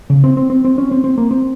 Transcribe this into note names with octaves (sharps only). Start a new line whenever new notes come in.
C#3
C4
C4
C4
C4
C#4
C4
C4
A#3
C4